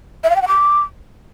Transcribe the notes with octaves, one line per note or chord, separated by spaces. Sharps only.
E5
F5
G5
F#5
D6